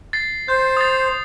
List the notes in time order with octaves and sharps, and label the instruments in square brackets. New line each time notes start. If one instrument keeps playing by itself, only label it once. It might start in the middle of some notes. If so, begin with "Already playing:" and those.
[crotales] A6 C7
[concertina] C5 [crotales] G6
[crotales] D#6 A6